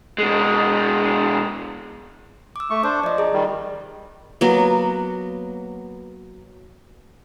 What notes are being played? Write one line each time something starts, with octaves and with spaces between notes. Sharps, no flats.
B2 G#3
D6 E6
A3 C#6
D4 C5 D6
F3 D5 D#5
G#4 A#5
D#3 G3
F#3 A#3 B3